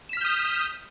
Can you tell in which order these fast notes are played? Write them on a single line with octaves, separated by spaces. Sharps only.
E7 B6 F6 G6 D#6